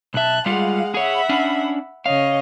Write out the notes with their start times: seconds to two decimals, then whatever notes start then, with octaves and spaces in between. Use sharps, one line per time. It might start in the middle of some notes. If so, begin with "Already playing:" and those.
0.14 B1 E5 A5 F#6
0.46 G3 G#3 F4 F5 F#5
0.94 G#4 C#5 E5 F#5 B5
1.29 C#4 D4
2.06 C#3 C#5 D#5 F5